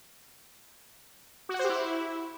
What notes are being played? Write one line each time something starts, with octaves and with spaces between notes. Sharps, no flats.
F#4
F#5
C5
G4
E4